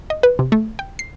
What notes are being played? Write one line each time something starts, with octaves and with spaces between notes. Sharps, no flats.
D#5
B4
C3
A3
G5
C7